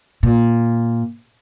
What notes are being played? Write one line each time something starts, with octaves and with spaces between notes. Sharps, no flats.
A#2